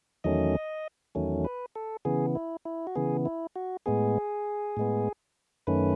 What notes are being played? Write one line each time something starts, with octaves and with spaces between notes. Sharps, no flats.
E2 D#3 F#3 A3 C#4 D#5
E2 D#3 F#3 A3 C#4
B4
A4
C#3 E3 B3 G#4
E4
E4
F#4
C#3 E3 B3 G#4
E4
F#4
A2 G#3 B3 G#4
A2 G#3 B3
F#2 D#3 A3 C#4 B4